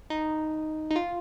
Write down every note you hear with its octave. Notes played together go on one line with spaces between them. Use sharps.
D#4
D#4
F4